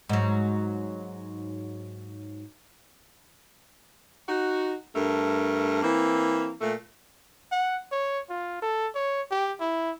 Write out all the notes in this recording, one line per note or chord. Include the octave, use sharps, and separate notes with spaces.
G#2 F#3
D#4 F#4
G2 A3 A#4
E3 A#3 C4
A#2 A3
F#5
C#5
F4
A4
C#5
G4
E4